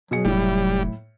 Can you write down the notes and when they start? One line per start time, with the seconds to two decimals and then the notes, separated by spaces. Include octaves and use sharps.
0.11 B2 F#3 G#4 C#7
0.25 F1 A2 G3 E4